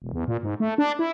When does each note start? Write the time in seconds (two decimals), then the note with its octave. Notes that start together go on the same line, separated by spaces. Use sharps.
0.02 E1
0.13 E2
0.28 A#2
0.43 G#2
0.60 A3
0.78 D4
0.99 E4